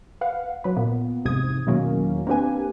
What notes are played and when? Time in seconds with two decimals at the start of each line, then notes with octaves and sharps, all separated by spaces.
0.21 B4 F5 F#5
0.64 F#3 B4
0.77 A#2 B3
1.25 A1 F2 G#2 C3 D#6 G#6
1.67 E2 B2 D#3 F#3 A#3 C#4
2.27 A#3 C4 D4 G4 B4 G#5